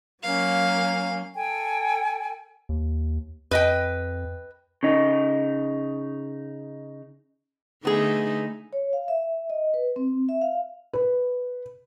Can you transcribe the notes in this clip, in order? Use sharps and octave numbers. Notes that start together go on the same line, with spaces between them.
F#3 A#3 C#4 F5
A4 G5 G#5
D#2
F2 B4 D#5 G5
C#3 D#4
D3 A3 B3 D#4 G#4
C#5
F5
E5
D#5
B4
C4
E5
F5
B4